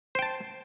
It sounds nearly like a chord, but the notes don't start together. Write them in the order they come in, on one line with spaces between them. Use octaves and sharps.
C5 G5 A5